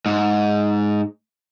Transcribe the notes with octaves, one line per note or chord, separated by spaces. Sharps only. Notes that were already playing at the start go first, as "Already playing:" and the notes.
G#2